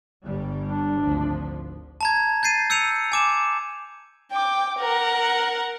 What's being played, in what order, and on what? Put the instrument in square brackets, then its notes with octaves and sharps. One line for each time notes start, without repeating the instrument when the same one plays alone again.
[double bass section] G1 G3
[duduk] D4
[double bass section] G#1 D2 F3
[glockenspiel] A5 A#5 G#6
G6 A6 C7 D#7
E6 G6 C#7 D#7 F7
G#5 D6 E7
[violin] G5 D6
A#4 F#5